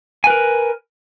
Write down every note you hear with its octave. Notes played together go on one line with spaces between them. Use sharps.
A#4 B4 G#5